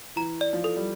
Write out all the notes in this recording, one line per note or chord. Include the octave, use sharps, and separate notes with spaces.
E3 A#5
D5
F3
A4
G3